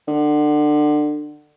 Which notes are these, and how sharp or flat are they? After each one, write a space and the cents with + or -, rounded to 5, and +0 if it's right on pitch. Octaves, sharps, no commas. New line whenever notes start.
D3 +25